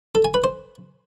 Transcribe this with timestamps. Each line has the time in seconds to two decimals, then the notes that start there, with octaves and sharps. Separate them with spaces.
0.15 A4
0.25 G#5
0.34 B4
0.44 C5